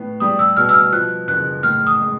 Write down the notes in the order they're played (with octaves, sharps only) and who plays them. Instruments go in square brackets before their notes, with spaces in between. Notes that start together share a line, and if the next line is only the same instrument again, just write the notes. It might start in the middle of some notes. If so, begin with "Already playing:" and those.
Already playing: [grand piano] A2 B3
[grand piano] G3 [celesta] D#6
[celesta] E6
[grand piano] B2 [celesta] F6
[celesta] E6
F6
[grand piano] F3 [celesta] F#6
[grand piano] F#1 [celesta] F#6
[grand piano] A2 [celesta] F6
[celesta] D#6
[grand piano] G#3